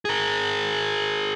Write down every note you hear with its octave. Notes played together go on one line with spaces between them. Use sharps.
G#4 A#4